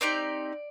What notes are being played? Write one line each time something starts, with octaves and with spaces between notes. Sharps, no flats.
C4 D#4 G4 D5